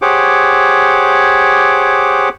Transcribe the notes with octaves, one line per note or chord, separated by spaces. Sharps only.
G4 G#4 C5 C#5 F#5 D6